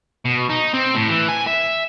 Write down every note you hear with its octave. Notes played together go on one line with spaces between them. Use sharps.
B2
D#4
C4
A2
E3
G#5
E5